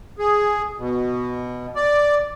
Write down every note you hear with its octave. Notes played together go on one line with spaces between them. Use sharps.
G#4
B2
D5